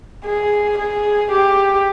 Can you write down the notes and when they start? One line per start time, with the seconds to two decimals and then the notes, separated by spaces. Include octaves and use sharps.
0.25 G#4
0.78 G#4
1.32 G4